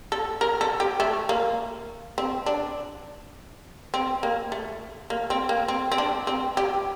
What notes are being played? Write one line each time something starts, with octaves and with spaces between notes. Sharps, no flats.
A4
A#4
A4
G4
A3
A#3
C4
D4
C4
A#3
A3
A#3
C4
A#3
C4
C4
D4
C4
G4